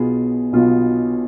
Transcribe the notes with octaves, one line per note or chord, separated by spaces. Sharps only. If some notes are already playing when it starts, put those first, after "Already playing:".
Already playing: B1 B2 B3 F4 G#4
B1 B2 B3 F4